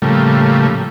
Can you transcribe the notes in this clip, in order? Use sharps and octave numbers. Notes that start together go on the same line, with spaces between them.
A2 C#3 F3 G3 A3 A#3